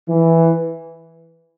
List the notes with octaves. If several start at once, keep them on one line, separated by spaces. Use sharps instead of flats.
E3